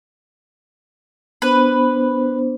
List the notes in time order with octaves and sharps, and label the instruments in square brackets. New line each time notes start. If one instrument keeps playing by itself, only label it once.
[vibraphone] B3 D4 C5 [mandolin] B4